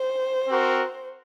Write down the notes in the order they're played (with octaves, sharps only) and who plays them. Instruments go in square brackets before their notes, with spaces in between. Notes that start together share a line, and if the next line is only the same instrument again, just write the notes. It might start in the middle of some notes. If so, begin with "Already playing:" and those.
Already playing: [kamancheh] C5
[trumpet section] C4 F#4 A#4